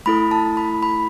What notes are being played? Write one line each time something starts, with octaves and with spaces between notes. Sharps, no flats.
A3 E4 A4 B5
A5
B5
B5